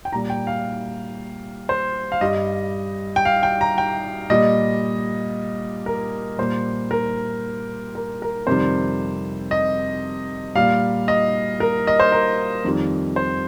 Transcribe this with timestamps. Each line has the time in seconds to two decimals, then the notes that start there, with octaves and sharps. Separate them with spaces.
0.05 G5
0.13 A#2 G3 A#5
0.30 G5
0.47 F5
1.69 C5
2.12 F5
2.21 G2 G3 D#5
3.16 G5
3.25 F5
3.43 G5
3.61 A#5
3.78 G5
4.30 A#2 G3 D#5
5.86 A#4
6.38 A#2 G3 C5
6.91 A#4
7.95 A#4
8.22 A#4
8.47 F2 C3 D#3 G3 C5
9.51 D#5
10.55 A#2 G3 F5
11.08 D#5
11.60 A#4
11.87 D#5
12.00 C5
12.12 A#4
12.64 F2 D#3 G3
13.16 C5